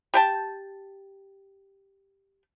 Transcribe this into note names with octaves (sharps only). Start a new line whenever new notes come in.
G4 G5 A5